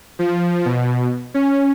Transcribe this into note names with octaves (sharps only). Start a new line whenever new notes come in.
F3
B2
C#4